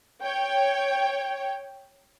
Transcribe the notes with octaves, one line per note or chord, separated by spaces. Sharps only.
C#5 G5